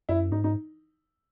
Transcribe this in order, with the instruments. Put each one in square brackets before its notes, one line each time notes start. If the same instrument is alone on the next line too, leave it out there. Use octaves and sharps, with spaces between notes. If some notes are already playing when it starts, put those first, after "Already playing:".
[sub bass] F#2 [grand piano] E4
[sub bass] G#2 [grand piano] D#4
[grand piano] D#4